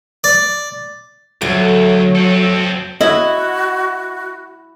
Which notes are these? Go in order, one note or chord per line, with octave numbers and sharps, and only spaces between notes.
D5
D2 F#3 A3
C4 A4
E4 F#4 D#5